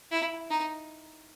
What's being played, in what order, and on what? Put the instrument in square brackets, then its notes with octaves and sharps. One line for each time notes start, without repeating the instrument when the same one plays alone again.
[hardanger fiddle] E4
D#4